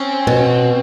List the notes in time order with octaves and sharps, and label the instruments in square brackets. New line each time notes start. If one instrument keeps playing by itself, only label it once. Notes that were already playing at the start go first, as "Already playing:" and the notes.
Already playing: [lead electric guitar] C4 [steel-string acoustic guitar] C#4
[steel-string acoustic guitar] B2